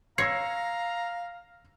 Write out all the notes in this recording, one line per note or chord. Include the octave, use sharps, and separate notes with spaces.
C#5 F5 A#5 E6 A#6 C7